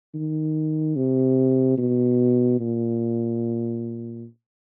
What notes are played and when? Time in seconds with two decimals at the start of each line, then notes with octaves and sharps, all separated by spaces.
0.14 D#3
0.96 C3
1.78 B2
2.60 A#2